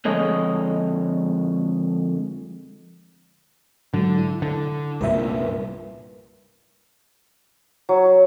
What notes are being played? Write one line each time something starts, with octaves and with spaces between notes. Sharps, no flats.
F2 D3 G#3 C#5 D#5
G#2 D3 F#3
E4
D3
C2 G2 A#2 A#4 B4 E5
F#3